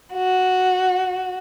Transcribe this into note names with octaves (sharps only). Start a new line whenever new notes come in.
F#4